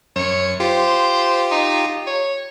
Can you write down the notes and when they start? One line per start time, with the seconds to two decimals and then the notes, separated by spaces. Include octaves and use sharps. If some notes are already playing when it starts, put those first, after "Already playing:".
0.16 F#2 C#5 C#7
0.60 F4 G4 C5
1.51 D#4
2.07 C#5